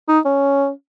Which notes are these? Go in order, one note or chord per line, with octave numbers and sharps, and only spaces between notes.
D#4
C#4